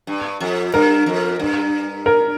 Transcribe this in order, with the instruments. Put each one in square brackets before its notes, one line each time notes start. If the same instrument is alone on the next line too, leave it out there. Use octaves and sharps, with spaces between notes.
[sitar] G2
F2
[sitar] G2 [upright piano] A#4
[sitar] F2
G2
[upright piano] A#4